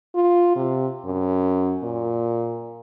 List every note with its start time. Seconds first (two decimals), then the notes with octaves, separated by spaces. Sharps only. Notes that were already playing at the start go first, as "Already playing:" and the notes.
0.15 F4
0.56 C3
1.05 F#2
1.83 A#2